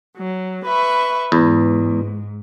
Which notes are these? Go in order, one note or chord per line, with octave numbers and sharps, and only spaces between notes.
F#3
B4 E5 C#6
E2 G#2